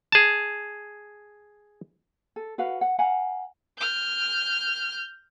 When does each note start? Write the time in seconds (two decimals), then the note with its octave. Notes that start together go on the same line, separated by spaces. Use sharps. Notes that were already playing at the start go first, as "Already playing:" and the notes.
0.12 G#4 A5
2.36 A4
2.58 F#4 B4 F5 F#5
2.81 F#5
2.99 F5 F#5 G#5 A#5
3.78 F6 G6